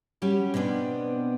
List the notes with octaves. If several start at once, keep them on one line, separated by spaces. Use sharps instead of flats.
G3 C#4 F#4 G4
B2 B3 C4 D4